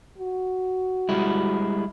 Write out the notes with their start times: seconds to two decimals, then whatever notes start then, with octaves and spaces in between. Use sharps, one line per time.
0.18 F#4
1.09 G3 G#3 E4